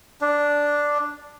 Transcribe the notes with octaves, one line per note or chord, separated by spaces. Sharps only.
D4